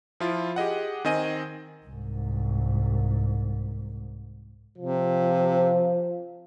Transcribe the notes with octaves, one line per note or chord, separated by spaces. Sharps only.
F3 E4 F4
G4 G#4 D#5 F#5
D#3 C4 D#5 G#5 D#7
C2 G#2
C3 F3